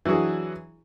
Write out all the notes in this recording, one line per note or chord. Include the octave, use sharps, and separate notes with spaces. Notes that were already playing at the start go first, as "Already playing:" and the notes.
E3 F#3 D4 F#4 G#4